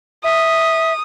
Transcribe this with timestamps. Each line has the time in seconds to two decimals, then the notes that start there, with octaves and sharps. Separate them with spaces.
0.24 E5 D#6